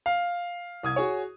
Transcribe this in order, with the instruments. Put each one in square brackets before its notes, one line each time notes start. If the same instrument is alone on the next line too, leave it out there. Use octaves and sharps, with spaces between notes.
[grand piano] F5
[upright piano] C2 D#6 G#6
F#4 G#4 C#5